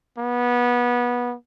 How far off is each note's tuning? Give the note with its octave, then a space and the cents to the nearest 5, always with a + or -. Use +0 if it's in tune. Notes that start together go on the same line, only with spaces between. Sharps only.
B3 -20